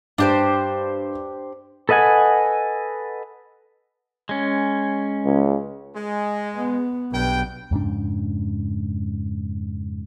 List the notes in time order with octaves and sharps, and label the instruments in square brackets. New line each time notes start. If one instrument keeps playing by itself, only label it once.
[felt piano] G2 [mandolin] D4 G4 C5
[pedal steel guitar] A4 B4 D#5 F#5 G#5
G#3 C#4
[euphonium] C#2
[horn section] G#3
[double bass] B3
[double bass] B1 [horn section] G2 B4 G5
[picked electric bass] F2 G#2 C#3 D4